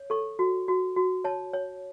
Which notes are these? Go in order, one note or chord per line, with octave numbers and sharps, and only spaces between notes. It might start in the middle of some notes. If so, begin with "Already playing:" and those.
Already playing: C#5
A4 C#6
F#4
F#4
F#4
C#5 A5
C#5